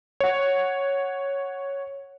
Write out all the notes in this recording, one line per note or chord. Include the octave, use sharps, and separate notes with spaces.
C#5 F#5